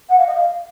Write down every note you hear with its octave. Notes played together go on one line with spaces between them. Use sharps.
F#5
F5
D#5
F5